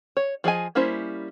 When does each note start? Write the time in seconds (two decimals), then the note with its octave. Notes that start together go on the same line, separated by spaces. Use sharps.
0.17 C#5
0.44 F3 G#4 D#5 G#5
0.75 G3 A#3 C#4 E4 C5